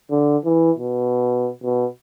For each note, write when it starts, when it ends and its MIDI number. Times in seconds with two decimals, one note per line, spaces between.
0.11 0.37 50
0.45 0.71 52
0.78 1.50 47
1.63 1.86 47